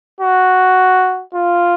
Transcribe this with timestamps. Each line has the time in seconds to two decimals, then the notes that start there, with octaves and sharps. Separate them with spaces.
0.20 F#4
1.34 F4